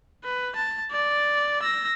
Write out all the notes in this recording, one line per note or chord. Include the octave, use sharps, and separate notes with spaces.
B4
A5
D5
E6 A#6